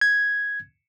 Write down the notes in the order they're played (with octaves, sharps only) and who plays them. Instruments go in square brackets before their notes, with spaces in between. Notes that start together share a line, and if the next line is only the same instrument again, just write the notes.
[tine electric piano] G#6